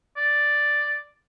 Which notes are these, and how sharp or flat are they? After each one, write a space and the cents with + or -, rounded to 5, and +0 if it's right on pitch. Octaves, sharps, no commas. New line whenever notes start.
D5 +0